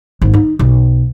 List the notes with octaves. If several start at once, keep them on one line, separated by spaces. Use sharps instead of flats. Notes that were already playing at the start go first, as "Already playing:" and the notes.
G#1
D#4
B1